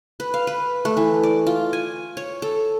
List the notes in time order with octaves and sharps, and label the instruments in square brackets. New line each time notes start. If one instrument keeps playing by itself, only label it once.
[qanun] B4
F5
B4
A3
E3
D5
F4
G#5
C#5
A4